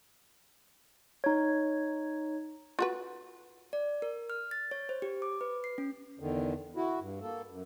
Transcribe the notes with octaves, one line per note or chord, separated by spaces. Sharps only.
D#4 C#5
F4 F#4 B4
D5
A#4
F6
A6
C#5
C5
G4
D6
B4
C7
C#4
E2 D3 D#3
E4 F#4
G2
A#3 A4
F#2